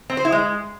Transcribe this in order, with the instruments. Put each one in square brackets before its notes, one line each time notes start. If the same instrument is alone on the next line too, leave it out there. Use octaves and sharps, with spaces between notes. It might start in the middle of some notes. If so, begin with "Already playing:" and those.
[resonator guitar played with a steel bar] C4
C5
E4
G#3